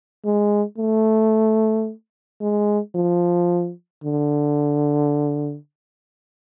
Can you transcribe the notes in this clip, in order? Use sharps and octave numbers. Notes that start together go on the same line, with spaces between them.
G#3
A3
G#3
F3
D3